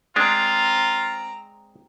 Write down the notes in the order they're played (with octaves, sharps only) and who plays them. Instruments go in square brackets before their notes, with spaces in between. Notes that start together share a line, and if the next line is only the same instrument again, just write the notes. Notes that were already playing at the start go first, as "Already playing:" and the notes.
[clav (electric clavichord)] G#3 D4 [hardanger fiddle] C4 A#5 [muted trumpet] F4